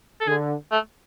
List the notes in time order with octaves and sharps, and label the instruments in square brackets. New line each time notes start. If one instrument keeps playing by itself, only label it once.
[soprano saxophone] A4
[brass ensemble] D3 [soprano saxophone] G#4
[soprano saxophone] A3